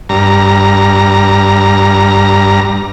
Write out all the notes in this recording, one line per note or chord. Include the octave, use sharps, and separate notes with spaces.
G2 A#5